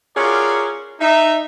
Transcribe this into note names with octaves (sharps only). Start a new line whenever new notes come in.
C#4 F4 F#4 G#4 A#4 D5
D#4 E5